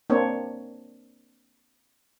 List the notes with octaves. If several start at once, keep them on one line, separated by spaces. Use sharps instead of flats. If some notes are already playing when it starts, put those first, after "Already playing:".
A#3 C4 D4 C#5